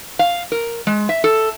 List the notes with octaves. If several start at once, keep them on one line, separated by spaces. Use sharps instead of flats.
F5
A#4
G#3
E5
A4